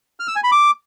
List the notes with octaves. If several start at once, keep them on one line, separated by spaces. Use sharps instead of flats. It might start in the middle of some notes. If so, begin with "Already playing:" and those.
F6
E6
G#5
B5
D6